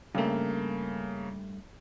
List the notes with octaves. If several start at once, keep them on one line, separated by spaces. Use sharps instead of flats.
G2 C#3 A3 A#3